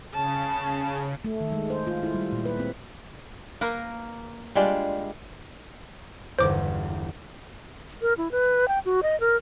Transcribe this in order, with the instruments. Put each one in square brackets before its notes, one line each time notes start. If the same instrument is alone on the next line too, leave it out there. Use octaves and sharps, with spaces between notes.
[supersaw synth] C#3 [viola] A5
[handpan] A3
D#3
G#3
C5
F4
E4
G3
A#2
B4
C4
[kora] A#3 A#4 B4
G3 G#3 D4 F4
[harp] G1 E2 [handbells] C5 D6
[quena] A#4
E4
B4
G5
F#4
D#5
A#4